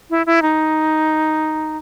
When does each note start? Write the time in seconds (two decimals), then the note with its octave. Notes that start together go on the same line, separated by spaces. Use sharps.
0.10 E4
0.26 E4
0.42 D#4